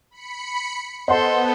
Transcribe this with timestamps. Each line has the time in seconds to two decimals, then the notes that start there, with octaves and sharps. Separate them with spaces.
0.11 B5 C#7
1.08 B3 A4 C5 D#5 F#5 A5 C6 G6